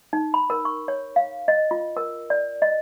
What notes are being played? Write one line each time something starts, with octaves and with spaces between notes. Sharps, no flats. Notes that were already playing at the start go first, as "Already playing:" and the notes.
D#4
B5
A#4
C#6
C#5
F5
D#5
F4
A#4
D5
D#5